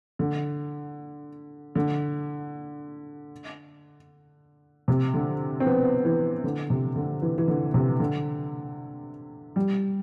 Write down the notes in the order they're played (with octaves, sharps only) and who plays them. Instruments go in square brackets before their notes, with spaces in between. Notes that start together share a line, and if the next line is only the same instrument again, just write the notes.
[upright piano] D3
D3
C3
D3
C4
B3
E3
D3
C3
D3
E3
E3
D3
C3
D3
G3